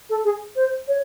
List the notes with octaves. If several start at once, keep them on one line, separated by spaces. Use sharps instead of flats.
A4
G#4
C5
C#5